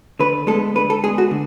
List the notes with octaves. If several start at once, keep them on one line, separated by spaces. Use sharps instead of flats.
D3 B4
G#3 B3 A4
D3 B4
A4
G#3 B3 G#4
F#4
D3